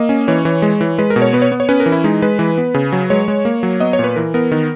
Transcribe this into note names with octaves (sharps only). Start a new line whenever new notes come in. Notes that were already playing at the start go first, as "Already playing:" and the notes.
Already playing: A#3 D#5
C#4
E3 C#5
E3
G#3
E3
G#3 B4
A#4
B2
C#5
B3 B4
C#5
B3
C#5
C#4 B4
A#4
E3
E4
G#3 D#4
G#3 B4
E3
B3
C#3
F#3
G#3 C#5
G#3
A#3
F#3
B3 D#5
C#5
A#2 B4
E3 A#4
B3 A#4
D#3